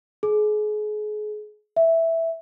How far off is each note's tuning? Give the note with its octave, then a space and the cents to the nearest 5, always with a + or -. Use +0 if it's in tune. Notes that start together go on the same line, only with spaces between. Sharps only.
G#4 +35
E5 +0